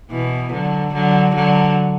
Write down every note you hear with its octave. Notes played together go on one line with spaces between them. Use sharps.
B2 E3
D3 F#3
D3 F#3
D3 F#3